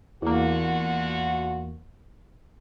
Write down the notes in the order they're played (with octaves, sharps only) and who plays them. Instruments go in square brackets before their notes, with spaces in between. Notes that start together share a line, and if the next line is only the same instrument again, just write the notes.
[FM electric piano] E2 A#3 [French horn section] D3 F4 F#4